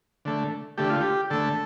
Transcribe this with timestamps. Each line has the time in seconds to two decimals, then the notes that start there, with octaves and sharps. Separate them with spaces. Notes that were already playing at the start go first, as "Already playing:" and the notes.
0.25 D3 A3
0.78 D3 A3 G4
0.90 F4
1.01 G4
1.30 D3 A3 A4